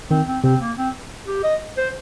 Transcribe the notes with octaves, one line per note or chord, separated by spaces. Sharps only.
D#3 C4
C4
C3 C4
A#3
C4
G4
D#5
C5